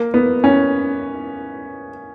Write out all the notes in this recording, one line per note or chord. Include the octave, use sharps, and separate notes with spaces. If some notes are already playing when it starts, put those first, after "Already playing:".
Already playing: A#3
B3
C#4